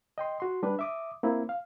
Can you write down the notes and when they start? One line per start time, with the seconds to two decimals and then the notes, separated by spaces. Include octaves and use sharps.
0.18 D#5 G5 C6
0.40 F#4 C6
0.63 G3 D4 B4
0.79 E5 D6 D#6
1.23 A#3 C4 E4
1.49 F5